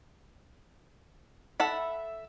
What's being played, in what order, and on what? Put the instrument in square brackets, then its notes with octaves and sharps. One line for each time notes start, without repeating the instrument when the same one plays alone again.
[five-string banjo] A4 F#5 B5 [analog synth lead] E5